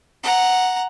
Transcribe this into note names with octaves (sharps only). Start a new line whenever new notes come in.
F#5 A#5